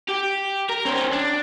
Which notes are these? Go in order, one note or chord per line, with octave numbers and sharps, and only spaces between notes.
G4
A#4
C#4 C5
D4